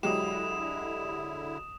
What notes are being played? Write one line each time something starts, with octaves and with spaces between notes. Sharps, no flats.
D3 F#3 G#3 E4 G4 D#6 E7